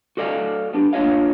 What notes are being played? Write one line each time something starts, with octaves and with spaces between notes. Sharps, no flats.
F#4 A4 D5 D#5 F5
B3 D4 G4
A#3 D4 F4 C#5 D#5 F5